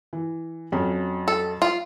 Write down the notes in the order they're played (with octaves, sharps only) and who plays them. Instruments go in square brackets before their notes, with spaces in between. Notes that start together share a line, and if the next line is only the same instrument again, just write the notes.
[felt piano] E3
F2 F#3 C#4
[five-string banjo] A4
F4